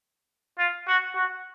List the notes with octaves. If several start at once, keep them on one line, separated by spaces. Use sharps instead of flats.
F4
F#4
F#4